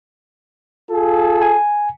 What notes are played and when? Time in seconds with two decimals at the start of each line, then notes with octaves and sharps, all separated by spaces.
0.90 F4 G#4 A4
1.42 G#5